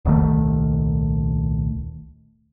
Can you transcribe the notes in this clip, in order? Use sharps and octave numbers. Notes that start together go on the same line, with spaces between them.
D#1 C2 D#3 A3